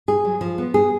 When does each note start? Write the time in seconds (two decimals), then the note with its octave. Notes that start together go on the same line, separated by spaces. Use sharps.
0.08 G#4
0.25 F#3
0.41 F3
0.58 B3
0.74 G#4